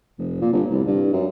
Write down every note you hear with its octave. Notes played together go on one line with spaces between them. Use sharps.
F1
A#2
G1
C2
G2
F#2